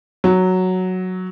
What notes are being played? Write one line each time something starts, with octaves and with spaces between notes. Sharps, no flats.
F#3